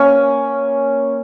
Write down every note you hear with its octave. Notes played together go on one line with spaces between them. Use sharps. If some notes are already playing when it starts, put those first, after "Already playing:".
Already playing: A#3 C#4